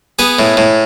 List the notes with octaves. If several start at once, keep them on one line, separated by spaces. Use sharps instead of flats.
B3 G#4
A2
A2